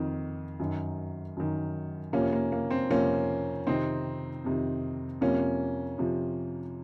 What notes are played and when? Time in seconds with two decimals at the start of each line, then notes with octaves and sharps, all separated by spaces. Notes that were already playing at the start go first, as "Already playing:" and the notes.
Already playing: F2 D#3
0.60 F#2 D#3
1.37 F#2 D#3
2.13 F2 C3 F3 A#3 C#4
2.33 A#3
2.52 A#3
2.71 C4
2.90 F2 C3 F3 A#3 C#4
3.67 F2 C3 D#3 C4 D#4
4.44 F2 C3 D#3
5.21 F2 C3 F3 A#3 C#4
5.98 F2 C3 F3